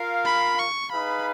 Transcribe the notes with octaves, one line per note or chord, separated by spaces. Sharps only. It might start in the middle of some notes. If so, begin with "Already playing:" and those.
Already playing: F4 A#4 F5
B5
C#6
D#4 G#4 B4 F5 B5